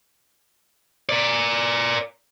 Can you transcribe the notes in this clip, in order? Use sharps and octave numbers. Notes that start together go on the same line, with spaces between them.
A#4 D5